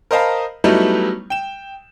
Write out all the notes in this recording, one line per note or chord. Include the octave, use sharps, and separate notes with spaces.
A#4 C5 D#5 F5 A5 B5
F#3 G3 A3 B3 D#4 E4
G5 E7